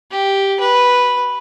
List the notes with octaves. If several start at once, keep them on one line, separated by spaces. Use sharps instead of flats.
G4
B4